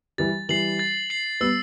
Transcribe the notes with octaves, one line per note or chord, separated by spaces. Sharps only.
E3 G3 A6
E3 G3 C7 F#7
A6
C7 F#7
G3 B3 E6